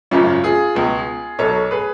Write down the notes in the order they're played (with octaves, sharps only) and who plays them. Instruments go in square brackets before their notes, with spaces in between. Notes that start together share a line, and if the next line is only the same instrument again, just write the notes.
[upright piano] G#1 F#2 C#3 C#4 F4
F4 G#4
C#2 B2
B1 B2 A4 C#5
G#4 B4